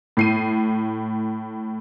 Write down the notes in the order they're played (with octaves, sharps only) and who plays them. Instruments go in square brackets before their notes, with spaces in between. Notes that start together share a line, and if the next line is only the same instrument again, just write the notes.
[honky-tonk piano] A2 C7 D#7